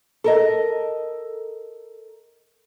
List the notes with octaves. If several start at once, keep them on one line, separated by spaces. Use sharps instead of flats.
A4 A#4 D#5